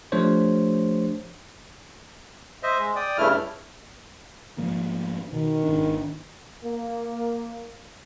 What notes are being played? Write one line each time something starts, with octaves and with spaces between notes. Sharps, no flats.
F3 A3 D4 G4 C5 C#5
C5 D#5 E5
G#3
D5 G5 D#6
G2 C#3 A3 E4 F6
G#2 F3 A#3
B2 D#3
G#1 D4
A#3